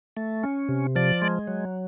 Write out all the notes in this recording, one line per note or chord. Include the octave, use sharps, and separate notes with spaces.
A3
C#4
C3
F3 D5
G#3
F#3